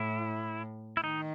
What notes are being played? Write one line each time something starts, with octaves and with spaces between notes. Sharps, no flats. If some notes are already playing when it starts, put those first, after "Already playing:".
Already playing: A2 E4
E4
D#3 D#4